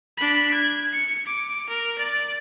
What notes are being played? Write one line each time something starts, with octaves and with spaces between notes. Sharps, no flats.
D4 B5
G#6
C#7
D6
A#4
D5 A6